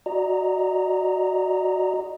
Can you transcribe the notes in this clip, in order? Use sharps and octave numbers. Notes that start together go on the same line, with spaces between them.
F#4 D5 D#5 A#5